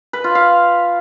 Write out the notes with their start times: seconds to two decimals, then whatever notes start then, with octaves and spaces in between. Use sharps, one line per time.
0.13 B4
0.24 F4
0.35 F5